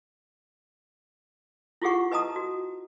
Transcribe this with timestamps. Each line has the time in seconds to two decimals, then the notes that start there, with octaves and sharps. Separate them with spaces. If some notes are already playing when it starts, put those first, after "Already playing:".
1.82 E4 F4 G4 G#4 F#5 C#6
2.12 B4 D#5 A5 A#5 D#6
2.36 F#4